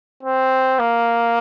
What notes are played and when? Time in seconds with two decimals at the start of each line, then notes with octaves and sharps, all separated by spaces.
0.23 C4
0.79 A#3